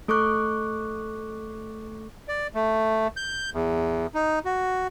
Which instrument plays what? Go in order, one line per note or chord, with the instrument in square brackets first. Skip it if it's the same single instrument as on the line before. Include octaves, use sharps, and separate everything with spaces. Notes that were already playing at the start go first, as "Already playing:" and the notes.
[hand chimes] A3 A4 C#6 D6 F#6
[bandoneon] D5
A3
G6
E2
D#4
F#4